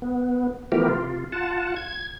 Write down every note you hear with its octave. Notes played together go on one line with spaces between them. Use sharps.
B3
E3 F3 A3 B3 G4 A#4
C3 F4
F4 F#5 A5
G#6